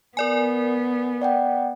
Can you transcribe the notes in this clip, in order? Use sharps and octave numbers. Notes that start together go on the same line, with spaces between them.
B3 A#4 D5 G#5
D5 F#5 G5